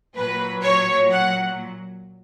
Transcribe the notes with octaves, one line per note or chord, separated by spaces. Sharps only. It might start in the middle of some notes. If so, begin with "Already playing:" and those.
A#2 F#3 B4
C#5
F#5